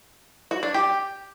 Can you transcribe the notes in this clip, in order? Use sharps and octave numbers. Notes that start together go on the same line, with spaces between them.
F#4
D4
G4